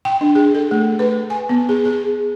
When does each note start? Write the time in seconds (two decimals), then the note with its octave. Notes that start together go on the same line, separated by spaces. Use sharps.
0.05 G5
0.21 D4
0.35 G#4
0.55 A4
0.71 A3
0.99 B4
1.30 G#5
1.49 B3
1.69 G#4
1.85 G#4